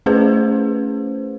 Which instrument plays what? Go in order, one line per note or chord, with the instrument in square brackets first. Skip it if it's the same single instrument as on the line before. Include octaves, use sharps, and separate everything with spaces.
[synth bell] A3 C#4 E4 G#4 B4 C5